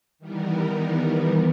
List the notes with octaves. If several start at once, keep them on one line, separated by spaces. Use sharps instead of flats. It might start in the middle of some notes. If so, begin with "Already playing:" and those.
D#3 E3 G3 B3 A#4